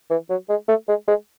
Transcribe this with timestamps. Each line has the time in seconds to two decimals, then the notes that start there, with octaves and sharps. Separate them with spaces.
0.11 E3
0.30 F#3
0.49 G#3
0.68 A3
0.89 G#3
1.08 G#3